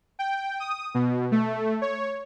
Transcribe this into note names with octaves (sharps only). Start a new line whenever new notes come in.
G5
D#6
B2
A3
C#5